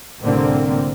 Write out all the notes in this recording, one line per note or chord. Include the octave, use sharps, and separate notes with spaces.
C2 A2 D3 A#3 C4